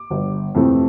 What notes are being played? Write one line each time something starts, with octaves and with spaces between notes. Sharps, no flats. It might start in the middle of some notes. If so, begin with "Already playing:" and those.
Already playing: D6
G1
F2 C3 E3 A3